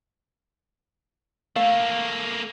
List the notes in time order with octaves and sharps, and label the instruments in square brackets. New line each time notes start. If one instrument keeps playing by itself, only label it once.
[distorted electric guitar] A3 A#3 [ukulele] F5